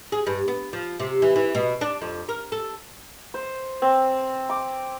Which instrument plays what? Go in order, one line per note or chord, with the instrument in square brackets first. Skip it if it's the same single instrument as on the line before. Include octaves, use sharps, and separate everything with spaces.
[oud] G#4
G2
B3
F3
C3
E3
E3
B2
D4
F2
A#4
A4
[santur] C5
C4
D6